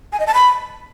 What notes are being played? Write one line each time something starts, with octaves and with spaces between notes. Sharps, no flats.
G#5
D#5
A5
B5